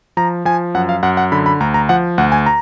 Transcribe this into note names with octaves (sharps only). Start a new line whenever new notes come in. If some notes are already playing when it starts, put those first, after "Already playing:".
F3 A#5
F3 G#5
F#2 F#5
F5
F#2 F#5
F#5
D3 B5
B5
D2 A#5
A#5
F3 F#5
D2 F#5
G#5
A#5